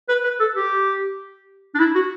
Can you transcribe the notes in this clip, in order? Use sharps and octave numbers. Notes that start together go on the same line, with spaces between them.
B4
B4
A4
G4
D4
E4
F#4